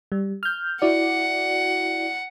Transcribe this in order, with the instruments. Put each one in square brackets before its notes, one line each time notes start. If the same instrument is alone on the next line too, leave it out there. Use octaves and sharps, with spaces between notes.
[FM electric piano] G3
F6 G6
[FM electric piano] E4 F#4 D5 [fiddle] F#5